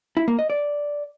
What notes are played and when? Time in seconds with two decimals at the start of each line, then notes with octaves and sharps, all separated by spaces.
0.17 E4
0.28 A#3
0.39 D#5
0.50 D5